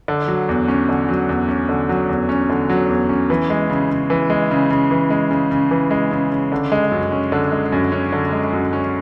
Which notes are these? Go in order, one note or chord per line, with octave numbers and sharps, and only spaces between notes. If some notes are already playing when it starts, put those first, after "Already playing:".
D3
F#3
E2
C#4
D3
F#3
E2
C#4
D3
F#3
E2
C#4
D3
F#3
E2
C#4
E3
G#3
C#3
C#3
E3
G#3
C#3
C#3
E3
G#3
C#3
C#3
E3
G#3
C#3
C#3
D3
G#3
F#2
C#4
D3
G#3
F#2
C#4
D3
G#3
F#2
C#4